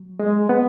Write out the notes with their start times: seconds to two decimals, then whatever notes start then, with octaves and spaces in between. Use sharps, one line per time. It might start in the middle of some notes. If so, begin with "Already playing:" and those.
Already playing: F#3
0.19 G#3
0.49 B3